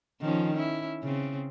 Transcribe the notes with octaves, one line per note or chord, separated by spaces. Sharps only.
D#3 F3 C#4
C#4 E4
C#3 C4